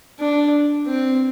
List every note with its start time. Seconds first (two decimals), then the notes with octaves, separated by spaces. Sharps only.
0.19 D4
0.87 C4